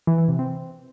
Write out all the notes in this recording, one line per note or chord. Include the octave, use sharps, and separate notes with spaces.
E3
E3
C3
C4